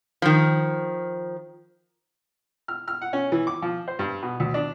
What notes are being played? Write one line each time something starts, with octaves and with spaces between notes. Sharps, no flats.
D#3 F3
F6
F6
F#5
C#4
E3
D6
F3
C5
G2
B2
D2
D4